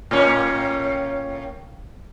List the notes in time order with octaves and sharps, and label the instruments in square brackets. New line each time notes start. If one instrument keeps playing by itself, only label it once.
[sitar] A2 A#3 C#4